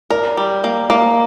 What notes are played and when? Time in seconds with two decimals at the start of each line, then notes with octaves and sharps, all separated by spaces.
0.10 A#4 D5
0.37 G3
0.64 A#3
0.90 A#3